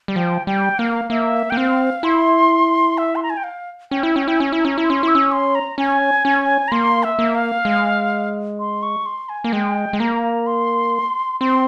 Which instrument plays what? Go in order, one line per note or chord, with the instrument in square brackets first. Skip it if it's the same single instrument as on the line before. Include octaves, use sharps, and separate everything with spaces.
[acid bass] G3
[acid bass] F3 [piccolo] G5
[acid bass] G3 [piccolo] G5
[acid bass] A#3 [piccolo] F5
[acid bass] A#3 [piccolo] E5
[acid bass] A#3 [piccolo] G5
[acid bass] C4 [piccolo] F5
[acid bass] E4 [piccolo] C6
[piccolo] E5
C6
A#5
G#5
G5
F5
[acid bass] C#4 [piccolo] G5
[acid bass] E4
[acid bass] C#4 [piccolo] G5
[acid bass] E4 [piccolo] G5
[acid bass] C#4 [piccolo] G#5
[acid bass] E4
[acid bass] C#4 [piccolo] A#5
[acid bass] E4
[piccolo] C6
[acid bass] C#4
[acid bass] E4 [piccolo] E6
[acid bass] C#4
[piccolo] C6
A#5
[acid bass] C#4 [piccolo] G#5
[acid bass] C#4
[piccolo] A#5
[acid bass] A#3 [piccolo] C6
[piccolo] E5
[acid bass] A#3
[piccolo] F5
[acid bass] G#3
[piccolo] C6
C#6
C6
G#5
[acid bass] A#3
[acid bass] G#3 [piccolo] G5
[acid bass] G#3
[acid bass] A#3 [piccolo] A#5
[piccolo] C6
[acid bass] C4 [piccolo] C6